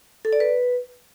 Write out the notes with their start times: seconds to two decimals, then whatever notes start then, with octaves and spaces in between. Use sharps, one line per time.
0.25 A4
0.33 D5
0.40 B4